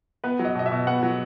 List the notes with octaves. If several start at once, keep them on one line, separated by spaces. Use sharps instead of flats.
B3 B4
F#3
D#5
B2 D#5
E5
B2
B3 F#5
F#3